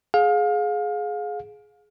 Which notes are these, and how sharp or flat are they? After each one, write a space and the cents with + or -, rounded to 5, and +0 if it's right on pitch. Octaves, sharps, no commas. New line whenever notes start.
G#4 +15 F5 +30